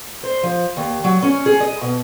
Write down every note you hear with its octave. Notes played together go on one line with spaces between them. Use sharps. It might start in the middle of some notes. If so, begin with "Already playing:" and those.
C5
F3
D#2
F#3
C#4
G#4
D#5
B2